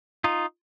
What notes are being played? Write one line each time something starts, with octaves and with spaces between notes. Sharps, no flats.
D#4 F4